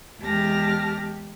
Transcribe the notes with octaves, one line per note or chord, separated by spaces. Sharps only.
E2 G#3 G4 A5 F6 A#6